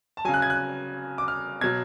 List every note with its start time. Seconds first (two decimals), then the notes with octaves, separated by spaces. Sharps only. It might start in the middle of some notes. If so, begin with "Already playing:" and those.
0.17 A5
0.25 C#3 F#3 G#5
0.34 F#6
0.42 G#6
0.50 F#6
1.18 D6
1.28 F6
1.61 B2 F#3 G#6